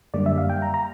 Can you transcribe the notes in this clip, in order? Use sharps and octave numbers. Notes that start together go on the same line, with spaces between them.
F#2 D3 G3 A#3 D5
E5
F5
G5
A#5
A#5